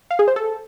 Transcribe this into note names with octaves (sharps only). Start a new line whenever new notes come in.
F5
G#4
C5
A4